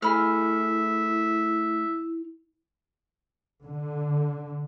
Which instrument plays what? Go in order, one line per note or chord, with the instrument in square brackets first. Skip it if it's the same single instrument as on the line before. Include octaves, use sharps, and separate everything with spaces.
[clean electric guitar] A3 G#4 [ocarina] E4 [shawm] E5 [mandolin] B5 F6
[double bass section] D3